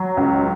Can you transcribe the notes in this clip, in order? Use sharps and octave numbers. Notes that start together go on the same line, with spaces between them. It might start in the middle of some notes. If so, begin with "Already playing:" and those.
Already playing: F#3
C#2